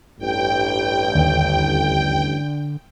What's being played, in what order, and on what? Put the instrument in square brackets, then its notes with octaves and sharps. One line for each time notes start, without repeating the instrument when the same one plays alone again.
[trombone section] A1 G2 [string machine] G5
[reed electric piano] D#2 [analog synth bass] D3